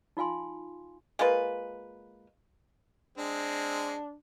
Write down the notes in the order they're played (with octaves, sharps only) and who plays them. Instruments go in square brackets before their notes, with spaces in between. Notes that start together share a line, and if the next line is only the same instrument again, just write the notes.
[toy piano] D#4 F4 F5 G#5 C6
[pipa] G#3 A#3 F4 B4
[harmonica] G#3 C4 [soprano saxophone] D4